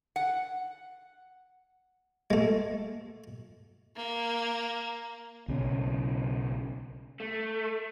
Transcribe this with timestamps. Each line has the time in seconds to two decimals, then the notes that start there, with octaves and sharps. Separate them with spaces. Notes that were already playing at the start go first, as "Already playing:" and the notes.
0.16 F#5
2.30 G#3 A3
3.96 A#3
5.48 B1 C#3 C#4
7.20 A3